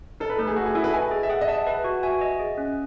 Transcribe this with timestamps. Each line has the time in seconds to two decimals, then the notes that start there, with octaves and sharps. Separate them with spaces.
0.20 D#4 A4
0.30 B4
0.39 A3 A4
0.47 G#4
0.56 A3 F#4
0.66 G#4
0.75 E4 A4
0.84 B4
0.93 D#5 G#5
1.11 G#4
1.23 E5
1.29 G#4 F#5
1.41 D#5
1.48 E5 A5
1.67 B4 F#5
1.84 F#4
2.03 E5 G#5
2.21 D#5
2.39 G#4
2.58 C#4